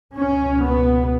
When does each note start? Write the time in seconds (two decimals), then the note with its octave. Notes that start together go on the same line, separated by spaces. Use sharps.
0.16 C#2 B2 C#4
0.63 B3